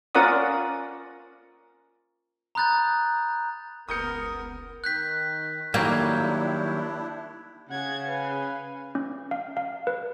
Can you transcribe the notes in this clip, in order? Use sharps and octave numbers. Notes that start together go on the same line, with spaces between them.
C#4 F4 A#4 D5 F#5 D#6
A#5 B5 D#6 F#6 G6 A6
F1 C#2 B3 A#4 D#6 G6 C#7
D#3 F#6 G6 B6
D#3 F#3 G3 A#3 D4 E4 G6 G#6
C#3 F#5 G#6
B4 F5 G#5
C#4
F5
F5
B4